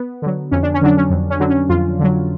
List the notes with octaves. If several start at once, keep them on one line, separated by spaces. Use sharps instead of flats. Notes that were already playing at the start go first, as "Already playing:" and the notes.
Already playing: B3
D3 F#3
F2 C#4
D4
C#4
D3 F#3 D4
C#4
F2
C#4
D3 F#3
C#4
F2 F4
D3 F#3